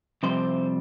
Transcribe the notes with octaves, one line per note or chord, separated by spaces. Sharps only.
F2 C3 G3 C4 C5